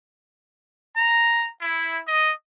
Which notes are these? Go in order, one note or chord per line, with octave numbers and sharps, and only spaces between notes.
A#5
E4
D#5